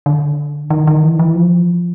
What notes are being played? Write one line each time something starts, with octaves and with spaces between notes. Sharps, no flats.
D3
D#3
D#3
E3
E3
F3